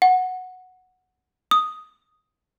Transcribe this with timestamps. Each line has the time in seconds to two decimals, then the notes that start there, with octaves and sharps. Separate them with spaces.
0.02 F#5
1.51 D#6